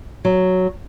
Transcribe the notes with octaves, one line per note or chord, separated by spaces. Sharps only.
F#3